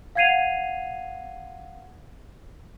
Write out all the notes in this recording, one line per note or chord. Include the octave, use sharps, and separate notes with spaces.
F5 F#5 G#6 C7 D#7 F7